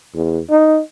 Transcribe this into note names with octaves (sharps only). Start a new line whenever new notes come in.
E2
D#4